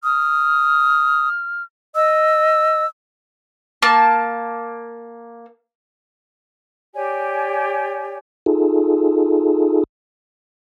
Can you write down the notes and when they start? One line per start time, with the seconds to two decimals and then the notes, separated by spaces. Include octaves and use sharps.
0.04 D#6 F6
1.95 D#5 E6
3.82 A#3 A5
6.94 G4 C#5 D5 G#5
8.46 D#4 F4 G#4 A4